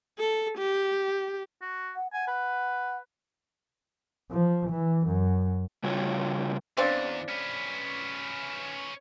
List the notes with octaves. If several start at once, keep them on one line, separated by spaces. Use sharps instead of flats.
A4
G4
F#4
F#5
F#5 G#5
B4
F3
E3
F#2
C#3 G3 F4 F#4 C#5
E2 C#3 C4 D4
C#4 B4